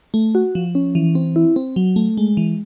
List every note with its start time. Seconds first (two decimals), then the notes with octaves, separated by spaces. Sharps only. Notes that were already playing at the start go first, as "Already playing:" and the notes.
0.14 A3
0.35 F#4
0.55 F3
0.75 C#4
0.95 E3
1.15 C4
1.36 E4
1.56 C4
1.76 F#3
1.96 A3
2.17 G#3
2.37 E3